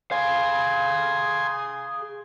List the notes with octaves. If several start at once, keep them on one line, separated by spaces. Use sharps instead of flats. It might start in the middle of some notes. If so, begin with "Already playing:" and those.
G#4 F5 G#5 C6